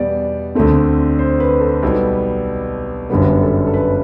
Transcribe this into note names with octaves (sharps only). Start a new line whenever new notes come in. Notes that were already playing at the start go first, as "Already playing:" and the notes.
Already playing: E2 B2 G3 B3 D5
D2 D3 A3 C4
C5
B4
A4
B1 B2 G3 B3
G1 F#2 D3 G3 B3 B4
A4
A4
B4